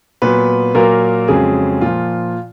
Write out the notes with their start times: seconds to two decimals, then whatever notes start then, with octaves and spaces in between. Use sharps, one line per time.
0.22 A#2 F#3 B3 B4
0.75 A#2 F#3 A#3 A#4
1.28 F2 C#3 F#3 G#3 G#4
1.81 A#2 F3 F4